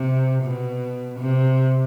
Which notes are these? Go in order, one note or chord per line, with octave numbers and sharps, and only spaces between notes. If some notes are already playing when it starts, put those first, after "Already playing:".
Already playing: C3
B2
C3